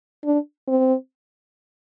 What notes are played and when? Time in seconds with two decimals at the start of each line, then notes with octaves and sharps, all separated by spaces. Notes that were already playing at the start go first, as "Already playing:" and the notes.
0.25 D4
0.68 C4